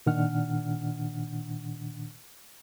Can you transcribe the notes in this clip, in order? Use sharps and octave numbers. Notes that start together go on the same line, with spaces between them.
A#2 D#3 D4 F#5 F6